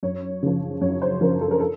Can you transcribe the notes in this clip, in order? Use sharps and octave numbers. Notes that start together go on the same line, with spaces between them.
F#2 C#5
C#3 F3
F#2 C#5
C5
C#3 F3 A#4
A4
A#4
A4